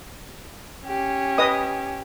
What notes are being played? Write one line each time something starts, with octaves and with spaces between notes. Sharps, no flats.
C#4 G4
B4 D#5 D#6